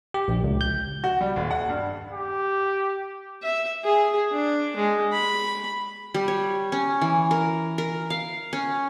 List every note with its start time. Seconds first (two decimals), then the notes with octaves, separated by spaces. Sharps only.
0.14 G4
0.28 A#1
0.44 C#2
0.61 G6
1.04 F#4
1.21 G3
1.36 D#1
1.51 F#5
1.69 G2
2.13 G4
3.43 E5
3.84 G#4
4.32 D4
4.77 G#3
5.13 B5
6.14 G3
6.28 C#5
6.72 C#4
7.01 E3
7.31 A#4
7.78 A#4
8.10 F5
8.53 C#4